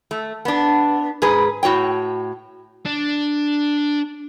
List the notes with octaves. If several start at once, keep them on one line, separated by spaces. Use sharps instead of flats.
A3
B3 D4
G#2 G#4 B4
A2 F#4 C#5 G5
D4